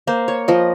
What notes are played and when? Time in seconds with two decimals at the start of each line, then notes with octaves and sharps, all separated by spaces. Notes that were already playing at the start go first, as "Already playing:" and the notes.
0.07 A#3 C5
0.28 C#5
0.48 F3 D#5